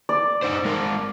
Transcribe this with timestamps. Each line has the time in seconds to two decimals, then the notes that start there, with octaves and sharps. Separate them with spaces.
0.09 D5
0.42 D#4 C5
0.65 G#3 A#4